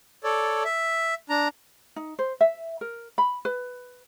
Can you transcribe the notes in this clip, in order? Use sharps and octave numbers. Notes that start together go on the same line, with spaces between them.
A4 C#5 D5
E5
D4 A#5
D#4
C5
E5
A#4
B5
B4